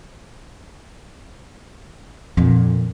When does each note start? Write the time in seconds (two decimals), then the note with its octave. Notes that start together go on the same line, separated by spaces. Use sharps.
2.37 F2 A#2 D3